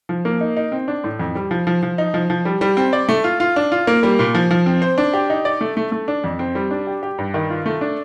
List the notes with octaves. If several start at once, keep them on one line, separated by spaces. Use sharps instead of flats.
F3
A#3
D#4
D#4
C4
D4
A2
F2
G3
F3
F3
F3
D#4
F3
F3
G3
G3
C4
D5
A3
F4
F4
D4
F4
A#3
G3
A#2
F3
F3
C4
C5
D4
G4
D#4
D5
A3
A3
A3
D4
F2
C4
G3
D4
G4
G4
G2
D#3
F4
A3
D4